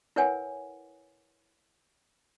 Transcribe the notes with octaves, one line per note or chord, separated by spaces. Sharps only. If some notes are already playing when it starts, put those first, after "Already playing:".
E4 A#4 B4 C#5 F#5 G#5